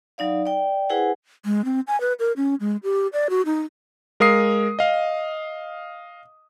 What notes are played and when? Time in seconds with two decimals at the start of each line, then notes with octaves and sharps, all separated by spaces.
0.18 F#3 D#4 D5 F5
0.45 D5 G5
0.90 E4 G#4 B4 C5 F#5 G#5
1.45 G#3
1.65 C4
1.87 G#5
2.01 B4
2.19 A#4
2.36 C#4
2.60 G#3
2.83 G4
3.13 D5
3.30 F#4
3.46 D#4
4.20 G#3 A#4 F5 D#6 C7
4.79 D#5 F5